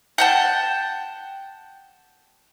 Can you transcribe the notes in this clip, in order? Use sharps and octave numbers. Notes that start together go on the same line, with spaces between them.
F#5 G5 A5